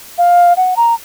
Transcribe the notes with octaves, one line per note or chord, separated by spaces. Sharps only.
F5
F#5
A#5